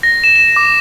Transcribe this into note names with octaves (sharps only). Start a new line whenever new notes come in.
A#6
E7
E7
D6